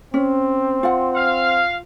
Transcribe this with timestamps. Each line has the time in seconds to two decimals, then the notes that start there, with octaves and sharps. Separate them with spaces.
0.14 C4 C#4
0.83 F4 F#5
1.15 F5